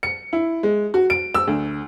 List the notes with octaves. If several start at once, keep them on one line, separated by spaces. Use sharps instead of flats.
C#7
E4
G#3
F#4
D7
E6
D2